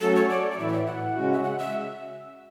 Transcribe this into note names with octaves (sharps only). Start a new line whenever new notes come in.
F#3 A3 C#4 F#4 A4
C#5
D5
D5
A2 E3 A3 E4 E5
D5
E5
F#5
C#3 G#3 C#4 F#4
E5
F#5
E5